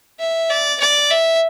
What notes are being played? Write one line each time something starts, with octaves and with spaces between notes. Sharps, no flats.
E5
D5
D5
E5